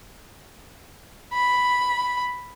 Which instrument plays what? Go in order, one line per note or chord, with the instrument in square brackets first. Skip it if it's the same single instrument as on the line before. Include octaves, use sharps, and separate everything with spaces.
[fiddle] B5